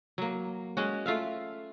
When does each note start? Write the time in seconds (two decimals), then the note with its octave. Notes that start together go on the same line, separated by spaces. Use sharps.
0.18 F#3 A#3
0.77 G#3 C#4 F#4
1.06 A3 F4 E5 F5